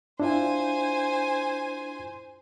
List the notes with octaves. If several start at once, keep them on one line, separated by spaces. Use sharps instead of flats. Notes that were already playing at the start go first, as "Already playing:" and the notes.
D4 E4 F4 C5 G#5